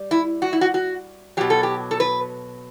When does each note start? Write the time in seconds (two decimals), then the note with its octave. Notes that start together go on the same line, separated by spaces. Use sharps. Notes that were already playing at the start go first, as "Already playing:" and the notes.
Already playing: G3
0.11 E4
0.42 F#4
0.53 E4
0.61 F#4
0.74 F#4
1.37 B2 F#3 G4
1.50 A4
1.63 G4
1.91 A4
2.00 B4